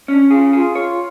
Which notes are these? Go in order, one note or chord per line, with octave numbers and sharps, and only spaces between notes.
C#4 D4
F4 G#4
F4 G#4
C#5